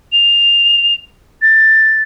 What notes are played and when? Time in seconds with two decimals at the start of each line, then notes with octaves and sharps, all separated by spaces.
0.12 F7
1.42 A6